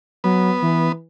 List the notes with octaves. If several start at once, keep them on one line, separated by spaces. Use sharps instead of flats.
F#3 B3
E3